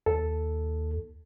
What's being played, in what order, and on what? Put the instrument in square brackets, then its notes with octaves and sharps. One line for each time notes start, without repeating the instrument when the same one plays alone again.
[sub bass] D#2 [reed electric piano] A4